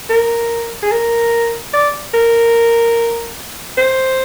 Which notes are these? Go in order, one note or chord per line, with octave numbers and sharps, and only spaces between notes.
A#4
G#4
A#4
D5
A#4
C5